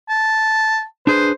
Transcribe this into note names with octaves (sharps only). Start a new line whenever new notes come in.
A5
D4 G#4 B4 C5